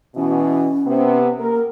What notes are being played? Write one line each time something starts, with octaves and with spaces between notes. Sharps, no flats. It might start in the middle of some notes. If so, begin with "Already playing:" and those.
B2 E3 C#4
C3 B3
A#3 A#4